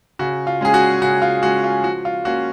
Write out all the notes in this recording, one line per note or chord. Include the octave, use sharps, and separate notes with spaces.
C#3 F#4
F4
G#3 C#4 G#4
F#4
C#3 F#4
F4
G#3 C#4 F#4
F4
F3 F#4
F4
A#3 C#4 F#4